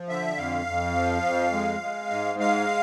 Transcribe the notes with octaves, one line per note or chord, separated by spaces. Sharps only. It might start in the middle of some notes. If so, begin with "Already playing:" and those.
Already playing: F3
D3 E5
F2 F5
F2
F3
F2
G#3
G#3
G#2
G#3 F5